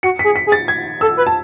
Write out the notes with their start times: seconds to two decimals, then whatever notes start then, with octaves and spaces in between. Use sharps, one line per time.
0.03 F#4 C#7
0.19 B6
0.24 G#4
0.36 B6
0.47 G#4
0.52 A6
0.68 G#6
1.01 A4 E6
1.17 B4
1.27 A5